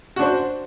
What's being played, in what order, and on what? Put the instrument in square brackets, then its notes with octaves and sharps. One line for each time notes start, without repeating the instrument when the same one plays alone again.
[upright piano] F#4
D4
C5